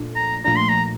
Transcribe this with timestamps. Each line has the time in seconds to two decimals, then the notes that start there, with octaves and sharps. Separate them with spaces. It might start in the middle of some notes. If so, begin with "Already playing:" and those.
Already playing: A#2 F3 A3 D4
0.15 A#5
0.45 A#2 F3 A3 D4 A#5
0.56 C6
0.69 A#5